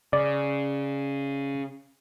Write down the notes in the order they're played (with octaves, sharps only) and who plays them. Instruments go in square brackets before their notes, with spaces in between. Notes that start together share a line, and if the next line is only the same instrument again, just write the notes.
[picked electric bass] C#3 [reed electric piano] D5